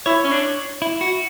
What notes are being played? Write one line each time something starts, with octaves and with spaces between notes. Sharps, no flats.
E4 C#5
C#4
D4
E4
F#4